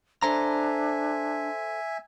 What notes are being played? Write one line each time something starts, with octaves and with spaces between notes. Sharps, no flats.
D4 A4 C5 E5 G#5 A#5